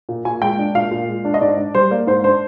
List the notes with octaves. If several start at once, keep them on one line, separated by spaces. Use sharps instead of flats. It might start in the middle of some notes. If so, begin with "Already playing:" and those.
A#2
A#2 G#5
G#3 G5
D4
A#2 F5
A#2
G#3
D4
D#5
G#2 D5
D4
G3 C5
A#3 D5
G#2 C5
D4 C5